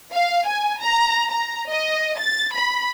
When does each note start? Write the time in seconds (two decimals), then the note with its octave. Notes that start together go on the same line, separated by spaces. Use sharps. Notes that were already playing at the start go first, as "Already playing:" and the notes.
0.13 F5
0.46 G#5
0.81 A#5
1.31 A#5
1.70 D#5
2.20 A6
2.54 B5